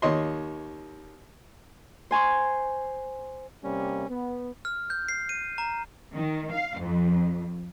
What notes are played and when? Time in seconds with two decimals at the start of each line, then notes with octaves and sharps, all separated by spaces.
0.02 D#2 C#5 D#5 C6
2.11 C5 G#5 C6 C#6
3.65 C3 G3 A#3 C#4
4.10 B3
4.65 F6
4.90 G6
5.08 C7
5.29 D#7
5.58 A#5
6.14 D#3
6.52 F5
6.80 F2